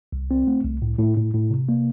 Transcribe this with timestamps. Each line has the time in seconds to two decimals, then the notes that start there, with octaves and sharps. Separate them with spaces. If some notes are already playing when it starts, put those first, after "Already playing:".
0.13 C2
0.31 C4
0.47 A3
0.64 C2
0.82 A2
0.99 A2
1.17 A2
1.34 A2
1.51 C3
1.69 A#3